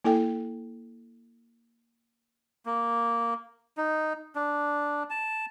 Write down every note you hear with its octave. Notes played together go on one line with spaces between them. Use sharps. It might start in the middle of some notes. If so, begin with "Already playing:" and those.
A#3 E4 A4 G5
A#3
D#4
D4
A5